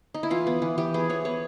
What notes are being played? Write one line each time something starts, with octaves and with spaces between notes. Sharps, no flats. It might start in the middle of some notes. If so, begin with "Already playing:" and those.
D#4
E4
E3 F4
B3
E3
E3 G4
B3 G#4
E3 C#5
B3 C#5